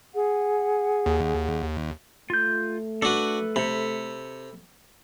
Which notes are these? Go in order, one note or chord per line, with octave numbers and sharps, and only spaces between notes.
G#4 F#5
D#2
A3 F4 G6
D4 F#4 A4 B4
C3 A4 B5